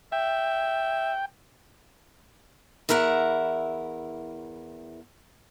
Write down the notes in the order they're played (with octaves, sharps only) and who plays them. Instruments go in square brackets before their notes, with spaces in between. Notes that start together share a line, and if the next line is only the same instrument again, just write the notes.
[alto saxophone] E5 [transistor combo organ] G5
[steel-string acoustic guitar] E2 E4 A#4 E5 F#5